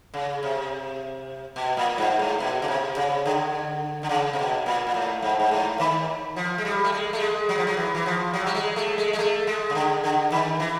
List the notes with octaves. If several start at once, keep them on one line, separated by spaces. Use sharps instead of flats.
C#3
C3
B2
A#2
G#2
A2
B2
C#3
C3
C#3
D3
D3
C#3
C3
B2
A#2
A#2
A2
G#2
G#2
A2
D#3
F3
G#3
G3
A3
G#3
A3
G#3
F#3
F3
F#3
E3
E3
F3
F#3
G3
G#3
A3
G#3
G#3
A3
G#3
C#3
D3
D3
D#3
E3